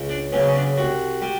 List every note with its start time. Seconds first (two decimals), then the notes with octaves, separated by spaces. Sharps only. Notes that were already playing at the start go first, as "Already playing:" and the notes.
Already playing: C#2
0.09 D4
0.32 C#3 F#3 B3 C#4
0.47 C#4
0.55 D4
0.77 C2 F#4
1.22 G3